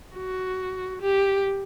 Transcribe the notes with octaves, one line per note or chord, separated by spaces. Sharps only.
F#4
G4